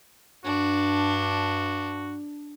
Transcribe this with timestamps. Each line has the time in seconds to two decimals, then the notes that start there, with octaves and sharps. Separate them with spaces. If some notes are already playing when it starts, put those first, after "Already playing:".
0.45 G2 D4 F#4